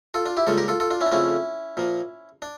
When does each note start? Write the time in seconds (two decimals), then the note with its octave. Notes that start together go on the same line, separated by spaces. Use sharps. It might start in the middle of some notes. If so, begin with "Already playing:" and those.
0.14 F4 A4
0.25 D4 F4
0.37 E4 G4
0.47 C#2 C#3 G3 A#3 F4 A4
0.57 G4 A#4
0.68 F4 A4
0.80 F4 A4
0.90 D4 F4
1.01 C#4 E4
1.06 D4
1.12 F2 C#3 F3 A3 C#4 E4
1.77 A#2 F3 A#3
2.42 D4